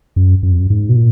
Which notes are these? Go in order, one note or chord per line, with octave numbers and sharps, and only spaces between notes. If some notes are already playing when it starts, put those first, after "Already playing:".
F#2
F#2
F2
F#2
G#2
B2
A#2